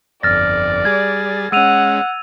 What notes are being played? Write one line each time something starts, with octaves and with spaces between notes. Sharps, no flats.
G1 F2 D5 F6 A6 A#6
G3 G#4 G#6 A6
G#3 C#4 F#5 E6 D#7 F7